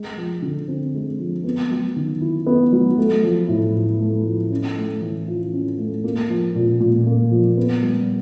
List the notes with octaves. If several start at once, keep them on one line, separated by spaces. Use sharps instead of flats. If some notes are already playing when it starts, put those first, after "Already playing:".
Already playing: G#3
F3
D3
C4
G#3
F3
B3
F#3
D#3
E4
B3
F#3
A3
F3
A2
A2
A3
F3
C#4
A3
E3
F4
C#4
A3
A#3
F3
A#2
A#2
A#3
F3
B3
G3